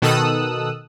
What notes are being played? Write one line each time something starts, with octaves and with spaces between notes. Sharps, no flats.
B2 D#3 A4 D#6 E6 F#6